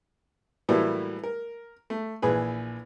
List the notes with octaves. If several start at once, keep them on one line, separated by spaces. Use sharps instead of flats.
A2 E3 F#3 G3 A3 A#3
A#4
A3
A#1 E3 G#4 B4